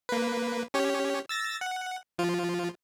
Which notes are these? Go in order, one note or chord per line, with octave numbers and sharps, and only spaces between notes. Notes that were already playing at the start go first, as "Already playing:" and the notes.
A#3 B4
C#4 G4 C#5
E6 A6 A#6
F#5
F3 F4